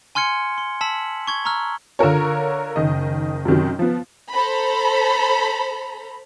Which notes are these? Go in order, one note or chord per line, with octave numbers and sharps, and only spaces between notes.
G#5 C6 F6 G#6 C#7
C6
A5 E6 B6 F#7
C#6 G#6 G7
A#5 C#6 E6 F6
D3 F4 A#4 C#5
F#1 D#3 D#5
F#2 C3 D#3 F#3
F3 B3
A4 C5 A#5 B5